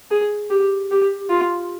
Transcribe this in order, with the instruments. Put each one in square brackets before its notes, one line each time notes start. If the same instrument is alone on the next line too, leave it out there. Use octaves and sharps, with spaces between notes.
[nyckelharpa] G#4
G4
G4
F4